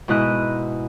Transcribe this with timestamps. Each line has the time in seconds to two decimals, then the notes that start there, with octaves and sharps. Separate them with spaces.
0.08 G#2 B2 E4 D#5 F#6